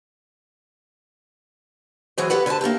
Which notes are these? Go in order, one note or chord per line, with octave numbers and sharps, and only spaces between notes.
E3 F#3 G#4 C5
G4 A4 B4 F#5
D3 B4 C5 G#5 A5
A#3 D4 E4 G4